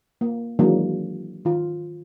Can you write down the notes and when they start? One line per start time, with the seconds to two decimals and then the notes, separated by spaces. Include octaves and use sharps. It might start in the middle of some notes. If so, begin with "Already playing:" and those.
0.21 A#3
0.59 D#3 E3 F#3 G#3 A#3 D4
1.45 D#3 F4